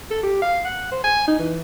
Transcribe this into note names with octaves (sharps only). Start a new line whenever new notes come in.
A4
G4
F5
F#5
C5
G#5
D#4
E3